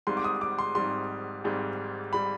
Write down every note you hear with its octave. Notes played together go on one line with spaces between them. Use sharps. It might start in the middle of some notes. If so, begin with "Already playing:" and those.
G#1 G#2 G3 C6
D6
D#6
D6
C6
G#1 G#2 G3 C6
G#1 G#2 G3
G3 B5